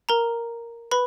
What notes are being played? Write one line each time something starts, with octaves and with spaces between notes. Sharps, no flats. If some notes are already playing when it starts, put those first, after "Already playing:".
A#4 A#5
B4 B5